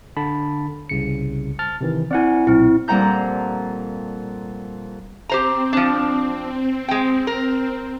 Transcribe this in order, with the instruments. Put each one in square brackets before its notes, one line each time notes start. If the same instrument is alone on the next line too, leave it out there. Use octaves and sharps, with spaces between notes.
[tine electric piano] D3 A5 B5
C2 C#3 C#7
A5 F6 A6
C3 D#3 E3
[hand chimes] C4 E4 [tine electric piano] D5 F#5 G#5
[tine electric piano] B1 A#2 [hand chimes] C4 E4
[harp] F2 A#2 G3 F#5 A#5 G6
[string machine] C4 [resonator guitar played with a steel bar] G4 C5 A#5
[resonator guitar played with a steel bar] F3 D4
G#3 G5
A#4